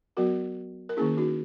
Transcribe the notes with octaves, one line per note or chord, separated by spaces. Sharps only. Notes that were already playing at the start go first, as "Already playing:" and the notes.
F#3 B3 F#4 A#4
A#4
D#3 A#3 C#4 E4 G#4
D#4 F#4